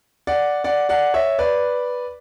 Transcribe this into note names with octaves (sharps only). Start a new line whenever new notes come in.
D5 F#5
D5 F#5
D5 F#5
C#5 E5
B4 D5